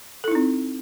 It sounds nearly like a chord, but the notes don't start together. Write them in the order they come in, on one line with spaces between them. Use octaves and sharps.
A4 E4 D#4 C4